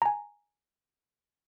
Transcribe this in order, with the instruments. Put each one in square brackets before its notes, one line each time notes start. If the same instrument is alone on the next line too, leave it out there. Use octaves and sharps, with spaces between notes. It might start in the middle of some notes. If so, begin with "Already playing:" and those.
[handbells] G#5 A#5